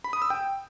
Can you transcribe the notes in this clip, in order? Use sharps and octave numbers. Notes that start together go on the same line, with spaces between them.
B5
D#6
E6
G5